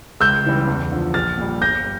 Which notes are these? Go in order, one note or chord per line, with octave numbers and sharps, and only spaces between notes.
C#2 E6 G6
C#3 E3 G3
E2
D3 F3
A#1 F6 A6
A#2 G3
G1 G6 A#6
G3